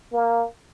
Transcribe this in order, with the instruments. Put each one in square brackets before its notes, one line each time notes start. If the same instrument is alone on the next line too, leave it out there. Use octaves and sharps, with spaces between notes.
[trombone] A#3